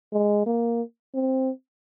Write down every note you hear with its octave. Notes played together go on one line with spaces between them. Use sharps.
G#3
A#3
C4